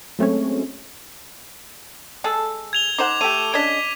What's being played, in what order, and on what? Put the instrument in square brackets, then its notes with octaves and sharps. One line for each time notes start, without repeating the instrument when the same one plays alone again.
[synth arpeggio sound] F#3 G#3 A3 C4 C#4 C#5
[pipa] G#3 G#4 A4
[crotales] G#6 F7 G7
[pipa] D#4 C5 F#5 [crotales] D6
[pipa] A3 G4 [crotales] D#7
[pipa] C#3 D4 D#5 [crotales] G#6 B6